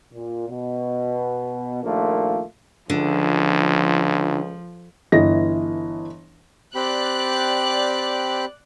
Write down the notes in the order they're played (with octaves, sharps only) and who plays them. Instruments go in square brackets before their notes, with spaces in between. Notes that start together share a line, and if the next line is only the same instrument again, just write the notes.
[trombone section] A#2
B2
A#1 D#2 A3 A#3 F4
[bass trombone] C#2 [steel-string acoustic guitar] D3 [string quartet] F3
[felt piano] G1 E3 D#5 A#6
[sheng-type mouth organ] C4 G4 B5 [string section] D5 F#6